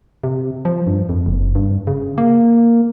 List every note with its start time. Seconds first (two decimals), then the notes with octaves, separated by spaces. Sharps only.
0.24 C3
0.65 F3
0.87 G2
1.09 F2
1.26 F#1
1.55 G2
1.87 C#3
2.18 A#3